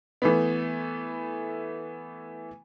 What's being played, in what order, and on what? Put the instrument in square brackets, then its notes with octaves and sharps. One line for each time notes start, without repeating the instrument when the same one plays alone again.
[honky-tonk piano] E3 A3 B3